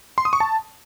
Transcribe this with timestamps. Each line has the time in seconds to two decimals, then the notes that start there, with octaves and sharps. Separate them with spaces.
0.18 C6
0.25 D#6
0.33 C#6
0.40 A5